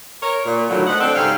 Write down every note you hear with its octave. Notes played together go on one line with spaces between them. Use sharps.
A#4 C#5
A#2
A2 D3 D#3 F#3
A3 C5 D#5 F#5
C4 D4 A4
G#2 C#3 G3 C4 A4 F5